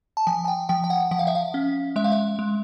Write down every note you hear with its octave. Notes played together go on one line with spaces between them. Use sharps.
A5
F3 G#5
G#5
G5
F3 G5
G5
F#5
F3 F#5
F5
E5
F5
C#4
G#3 E5
F5
E5
G#3